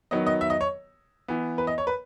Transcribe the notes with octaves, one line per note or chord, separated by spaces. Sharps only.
D#3 F#3 B3 D#5
D#5
E5
D#5
C#5
E3 B3
B4
D#5
C#5
B4